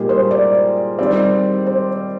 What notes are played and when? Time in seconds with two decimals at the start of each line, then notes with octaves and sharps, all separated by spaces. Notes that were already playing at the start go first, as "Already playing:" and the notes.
Already playing: A#2 G3 A#3 D#4 G4 G#4
0.09 C5
0.31 D5
0.99 D#3 G3 C4 D5
1.66 C5